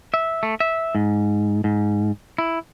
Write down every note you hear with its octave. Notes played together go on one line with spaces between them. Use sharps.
E5
A3
E5
G#2
G#2
E4